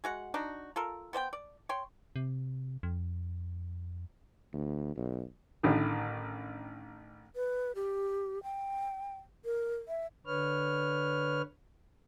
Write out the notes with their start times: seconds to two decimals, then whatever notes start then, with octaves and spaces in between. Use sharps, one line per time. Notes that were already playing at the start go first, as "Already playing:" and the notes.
0.04 G#3 F#4 F#5
0.34 D4 D#4 F#4
0.76 F4 A4 A#4
1.13 B3 C5 D5 G5
1.33 D5
1.69 C#5 G5 C6
2.16 C3
2.83 F2
4.53 D2
4.96 B1
5.63 A1 A2 D3 D#3
7.34 B4
7.75 G4
8.43 G5
9.45 A#4
9.88 E5
10.27 D3 B4 C#5 F6